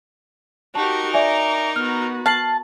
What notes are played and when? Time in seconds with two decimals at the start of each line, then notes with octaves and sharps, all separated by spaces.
0.75 D#4 F#4 G4 A#4 A5
1.14 D5 E5 G#5 D6
1.76 B3 F#4 F6
2.26 A5 F6 C7 F#7